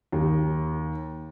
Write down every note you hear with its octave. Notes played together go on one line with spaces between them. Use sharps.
D#2